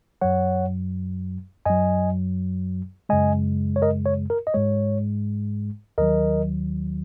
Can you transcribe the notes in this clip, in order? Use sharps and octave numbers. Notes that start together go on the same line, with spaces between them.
F#2 F#3 C#5 F#5
F#2 F#3 D#5 G#5
F#2 C#3 G#3 D#5 G#5
C#5
A#4 D#5
C#5
A#4
D#5
G#2 G#3 C#5
D#2 D#3 F#3 A#4 D#5